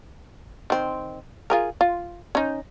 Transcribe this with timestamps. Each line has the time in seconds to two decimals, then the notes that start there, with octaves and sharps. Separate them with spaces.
0.70 D#3 C4
1.50 F4 G#4 A#4
1.81 F4
2.35 C#4 D#4